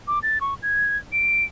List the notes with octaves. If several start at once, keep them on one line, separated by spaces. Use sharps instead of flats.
D6
A6
C#6
G#6
D7